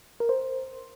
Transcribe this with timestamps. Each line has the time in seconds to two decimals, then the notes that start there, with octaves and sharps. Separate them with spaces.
0.20 A#4
0.29 C5